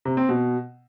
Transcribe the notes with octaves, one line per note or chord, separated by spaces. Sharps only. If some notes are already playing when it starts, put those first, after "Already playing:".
C3
C4
B2